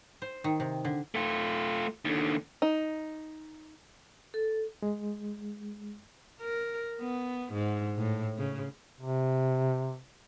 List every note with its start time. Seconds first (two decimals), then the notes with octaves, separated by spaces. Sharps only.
0.22 C5
0.44 D#3
0.60 C3
0.85 D3
1.15 A3 F4
2.05 D#2 D3
2.62 D#4
4.34 A4
4.82 G#3
6.41 A#4
7.00 B3
7.53 G#2
7.97 A2
8.38 C#3
9.01 C3